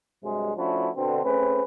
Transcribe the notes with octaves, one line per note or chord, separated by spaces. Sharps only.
G2 C3 F#3 G#3
F3 A3 C#4 D4 E4 F#4
B2 D3 C4
A3 C4 C#4 G#4 B4